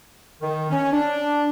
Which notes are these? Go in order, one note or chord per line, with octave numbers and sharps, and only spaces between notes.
D#3
C#4
D4